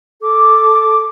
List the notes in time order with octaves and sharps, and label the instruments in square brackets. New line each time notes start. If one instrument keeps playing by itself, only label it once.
[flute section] A4 D6